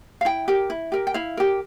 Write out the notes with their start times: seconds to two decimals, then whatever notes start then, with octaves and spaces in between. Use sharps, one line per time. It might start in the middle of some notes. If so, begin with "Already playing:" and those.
0.21 F5
0.25 E4 G5
0.48 G4 A#4
0.70 E4
0.92 G4 A#4
1.07 G5
1.14 E4 F5
1.37 G4 A#4